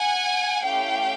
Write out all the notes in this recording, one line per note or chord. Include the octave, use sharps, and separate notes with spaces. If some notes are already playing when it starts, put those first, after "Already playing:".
Already playing: F#5 G#5
A3 C#4 E4 G4 F5 G5